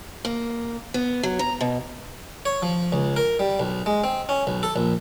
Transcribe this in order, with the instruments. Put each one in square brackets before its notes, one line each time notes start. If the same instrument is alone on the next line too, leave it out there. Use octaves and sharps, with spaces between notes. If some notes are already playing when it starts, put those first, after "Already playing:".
[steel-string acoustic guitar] A#3
B3
F#3
A#5
B2
[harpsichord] C#5
F3
C#2
A#4
G3
B1
G#3
C4
C#4
B1
A4
A#1